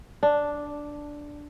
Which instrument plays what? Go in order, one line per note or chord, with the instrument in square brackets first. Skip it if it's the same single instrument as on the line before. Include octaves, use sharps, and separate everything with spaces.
[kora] D4